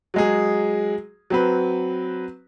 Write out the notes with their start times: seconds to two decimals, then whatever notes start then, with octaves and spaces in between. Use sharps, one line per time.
0.14 F#3 G#3 G#4
1.30 F#3 C4 B4